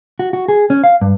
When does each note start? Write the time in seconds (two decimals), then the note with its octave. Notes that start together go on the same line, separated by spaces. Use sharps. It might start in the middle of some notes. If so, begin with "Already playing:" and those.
0.19 F#4
0.33 F#4
0.48 G#4
0.70 C#4
0.84 F5
1.01 G2